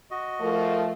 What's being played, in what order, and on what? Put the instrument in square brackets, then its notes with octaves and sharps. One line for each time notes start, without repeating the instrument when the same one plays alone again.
[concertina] F#4 D#5
[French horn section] F3 A3 [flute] A#4